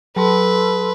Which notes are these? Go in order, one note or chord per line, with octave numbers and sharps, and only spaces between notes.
F#3 A4 B4 A5 C6